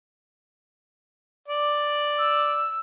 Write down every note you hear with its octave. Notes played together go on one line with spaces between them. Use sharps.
D5
E6